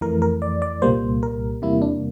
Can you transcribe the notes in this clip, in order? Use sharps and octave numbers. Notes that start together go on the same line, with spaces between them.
F2 E3 A3 A#4
A#4
D5
D5
C2 A#2 G3 A#3 C5
A#4
E2 C3 G3 A#3 E4
D4